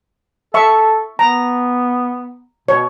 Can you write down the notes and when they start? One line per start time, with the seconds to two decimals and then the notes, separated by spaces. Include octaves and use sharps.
0.54 A4 E5 C#6
1.19 B3 A#5
2.68 B2 C#5